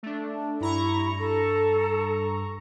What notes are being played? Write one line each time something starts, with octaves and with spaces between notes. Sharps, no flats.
A3 D4
G2 E4 A#5 C#6
A4